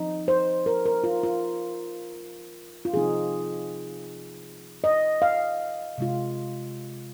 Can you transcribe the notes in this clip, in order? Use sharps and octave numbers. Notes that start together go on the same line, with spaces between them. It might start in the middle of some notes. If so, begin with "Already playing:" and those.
Already playing: F3 C4 D#4
C5
A#4
A#4
F4
F4
F4
C3 F3 C4 D#4 G#4
D#5
F5
C3 G#3 F4